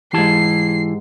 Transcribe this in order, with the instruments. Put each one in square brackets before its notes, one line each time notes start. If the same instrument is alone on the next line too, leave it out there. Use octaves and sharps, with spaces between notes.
[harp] G#2 G4 [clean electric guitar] E3 E4 A5 [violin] C7